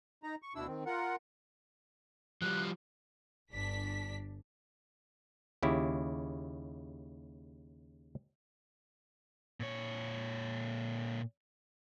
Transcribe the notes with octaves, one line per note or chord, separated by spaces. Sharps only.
D#4 A#5
C#6
D2 B2 D4 E4 E6
D#3 C4
F4 A#4 F#5
F3 G3 F#6
G1 D4 B6
D#2 C#3 E4 G4
A#2 C#5